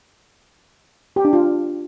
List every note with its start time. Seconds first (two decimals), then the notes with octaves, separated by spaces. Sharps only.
1.16 G4
1.25 D4
1.33 F4